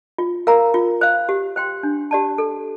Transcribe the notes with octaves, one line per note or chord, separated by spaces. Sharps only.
F4
A#4 F5 A#5
F4
C5 F5
G4
C5 G5 C6
D4
G4 D5 A5
A4